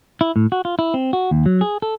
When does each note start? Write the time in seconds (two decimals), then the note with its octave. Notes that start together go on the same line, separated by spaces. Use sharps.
0.21 E4
0.36 A2
0.52 F#4
0.65 F4
0.79 E4
0.94 C4
1.13 F#4
1.31 D#2
1.46 F#3
1.61 G#4
1.82 A4